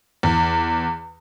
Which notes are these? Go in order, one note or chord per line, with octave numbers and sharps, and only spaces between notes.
E2